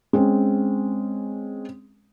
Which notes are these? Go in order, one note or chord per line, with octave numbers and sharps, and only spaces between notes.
G#3 C4 C#4